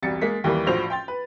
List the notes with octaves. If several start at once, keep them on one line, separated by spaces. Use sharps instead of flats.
E1 C2 G3 A6 C#7
G#3 A#3 B6
D#2 E3 G3 A#3
A#1 A2 F3 F#4 C5 F7
G5 C6 A6
B4